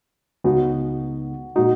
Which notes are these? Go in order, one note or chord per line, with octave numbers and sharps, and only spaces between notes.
C#2 C#3 G#3 B3 D#4 F#4
A#2 G#3 D#4 F#4